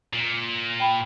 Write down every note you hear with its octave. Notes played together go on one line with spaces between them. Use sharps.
A#2
G5 B5